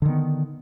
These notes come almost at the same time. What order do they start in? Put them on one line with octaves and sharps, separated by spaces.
D3 D#3 B3